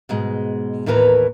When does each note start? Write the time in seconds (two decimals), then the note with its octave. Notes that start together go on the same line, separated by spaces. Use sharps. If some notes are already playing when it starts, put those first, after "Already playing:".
0.09 G#2 B2 G#3
0.86 D#2 A2 E3 A#4 B4 A#5